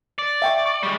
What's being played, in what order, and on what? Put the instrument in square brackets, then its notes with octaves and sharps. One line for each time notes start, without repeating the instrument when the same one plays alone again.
[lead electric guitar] D5
[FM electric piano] E5 G5 C#6
C#6
[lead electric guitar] G3 G#3